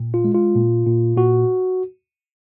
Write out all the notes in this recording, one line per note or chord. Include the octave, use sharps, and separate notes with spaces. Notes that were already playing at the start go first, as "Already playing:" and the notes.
Already playing: A#2
F4
G#3
F4
A#2
A#2
A#2 F#4